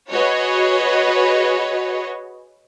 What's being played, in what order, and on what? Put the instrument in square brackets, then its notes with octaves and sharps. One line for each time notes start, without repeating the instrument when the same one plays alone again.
[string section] F#4 G#4 B4 C#5 D#5